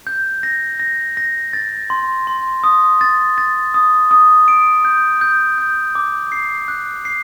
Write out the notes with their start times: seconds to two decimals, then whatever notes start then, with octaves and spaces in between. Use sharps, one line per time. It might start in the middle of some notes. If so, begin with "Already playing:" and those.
0.07 G6
0.43 A#6
0.80 A#6
1.17 A#6
1.53 A6
1.90 C6
2.27 C6
2.64 D#6
3.01 A6
3.38 A6
3.74 D#6
4.11 D#6
4.48 D7
4.85 G6
5.21 G6
5.58 G6
5.95 D6
6.32 C7
6.68 F#6
7.05 C7